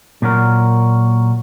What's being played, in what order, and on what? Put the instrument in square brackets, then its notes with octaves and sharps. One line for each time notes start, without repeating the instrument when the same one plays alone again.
[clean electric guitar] A#2 F#3 F#4 A#4